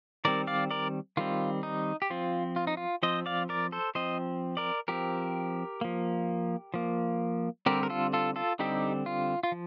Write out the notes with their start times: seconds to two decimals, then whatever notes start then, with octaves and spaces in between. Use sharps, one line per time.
0.25 D#3 G3 C4 A#4 D5
0.47 D5 F5
0.71 A#4 D5
1.17 D#3 G3 C4 F4
1.63 D#4
2.02 G4
2.10 F3 C4 F4
2.56 F4
2.67 D#4
2.77 F4
3.03 F3 C4 C5 D#5
3.26 D5 F5
3.49 A#4 D5
3.72 A4 C5
3.95 F3 C4 C5 D#5
4.57 A#4 D5
4.88 F3 C4 G4 A#4
5.81 F3 A#3
6.74 F3 A#3
7.66 D3 G3 C4 G4 A#4
7.83 A#4
7.90 F4 A4
8.13 F4 A4
8.36 F4 A4
8.59 D3 G3 C4 D#4 G4
9.06 F4
9.43 F4
9.52 F3